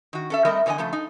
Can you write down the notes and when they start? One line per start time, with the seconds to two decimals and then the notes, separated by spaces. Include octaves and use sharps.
0.13 D#3 F#4
0.30 C#4 A4 E5
0.45 G3 A3 C4 A#4 D#5 E5
0.66 E2 D3 B3 D#4 D#5 G#5
0.78 C#3 F3 A3 A4
0.93 D#4